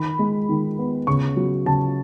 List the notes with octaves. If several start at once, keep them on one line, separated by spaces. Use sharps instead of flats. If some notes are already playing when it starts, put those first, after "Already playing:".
Already playing: D#3 B5
G#3
D#3
B3
C#3 C#6
F#3
C#3 A5